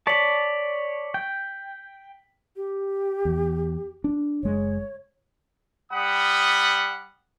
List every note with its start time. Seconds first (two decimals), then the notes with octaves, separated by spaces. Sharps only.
0.07 C#5 D5 A5 B6 F#7
1.14 G5
2.56 G4
3.25 E2
4.04 D4
4.43 F#1 G#3 C#5
5.92 G3 F#5 B5 D#6